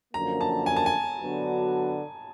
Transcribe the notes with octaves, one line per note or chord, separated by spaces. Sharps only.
F#2 D3 F3 A#3 A#5
A5
G#5
A5
G#5
D3 F#3 B3 D4 F#4